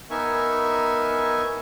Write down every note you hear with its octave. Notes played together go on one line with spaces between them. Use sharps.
B3 D#4 A#4 E5 G#5 C#6